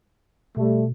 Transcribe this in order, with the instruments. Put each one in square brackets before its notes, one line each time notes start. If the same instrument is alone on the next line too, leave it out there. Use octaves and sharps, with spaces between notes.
[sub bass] B2 [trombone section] G3 A3